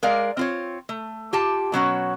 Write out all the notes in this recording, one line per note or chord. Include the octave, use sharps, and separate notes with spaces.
G#3 A#4 D5 F5
C4 F4 C#5
A3
F4 G4 A5
B2 F#3 C#4 F#4